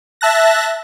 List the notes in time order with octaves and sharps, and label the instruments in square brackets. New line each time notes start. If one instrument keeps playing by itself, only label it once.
[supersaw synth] E5 A5 F#6 A#6